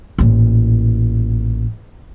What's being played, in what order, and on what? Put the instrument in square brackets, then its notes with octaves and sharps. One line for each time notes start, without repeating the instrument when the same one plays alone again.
[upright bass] A1 A#2